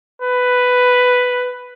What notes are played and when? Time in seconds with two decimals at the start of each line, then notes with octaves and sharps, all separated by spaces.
0.21 B4